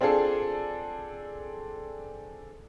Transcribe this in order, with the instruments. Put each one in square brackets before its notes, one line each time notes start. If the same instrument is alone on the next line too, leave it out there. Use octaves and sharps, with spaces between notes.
[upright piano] C4 D4 F4 G#4 A4